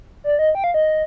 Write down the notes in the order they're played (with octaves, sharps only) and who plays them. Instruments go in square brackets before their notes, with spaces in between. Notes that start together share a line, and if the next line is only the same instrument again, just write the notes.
[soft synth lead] D5
D#5
G5
F5
D#5